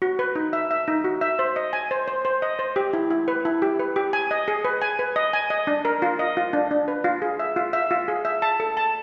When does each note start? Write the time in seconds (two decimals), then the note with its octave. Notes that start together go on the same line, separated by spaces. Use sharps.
0.02 F#4
0.19 B4
0.35 D#4
0.53 E5
0.71 E5
0.88 D#4
1.04 F#4
1.21 E5
1.39 C5
1.56 D#5
1.73 G#5
1.91 C5
2.08 C5
2.25 C5
2.42 D#5
2.59 C5
2.76 G4
2.93 E4
3.10 E4
3.28 B4
3.45 E4
3.62 G4
3.79 B4
3.96 G4
4.13 G#5
4.31 D#5
4.48 G#4
4.65 B4
4.82 G#5
4.99 B4
5.16 D#5
5.33 G#5
5.50 D#5
5.67 D4
5.85 A#4
6.02 F4
6.19 D#5
6.37 F4
6.53 D4
6.71 D4
6.88 B4
7.04 F4
7.22 G#4
7.39 E5
7.56 F4
7.73 E5
7.91 F4
8.08 G#4
8.25 E5
8.42 A5
8.60 A4
8.77 A5